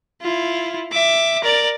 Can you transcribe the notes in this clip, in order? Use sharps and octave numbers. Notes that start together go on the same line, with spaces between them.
E4 F4
E5 D6
A#4 D5